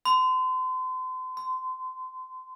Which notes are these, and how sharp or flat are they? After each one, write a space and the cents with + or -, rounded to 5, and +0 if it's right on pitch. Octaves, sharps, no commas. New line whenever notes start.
C6 -35
C6 -25